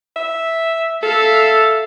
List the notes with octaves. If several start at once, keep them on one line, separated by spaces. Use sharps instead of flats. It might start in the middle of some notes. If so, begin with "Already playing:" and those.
E5
A4 E5 F5